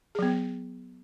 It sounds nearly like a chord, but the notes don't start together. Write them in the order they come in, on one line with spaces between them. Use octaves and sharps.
G#4 F#3 B3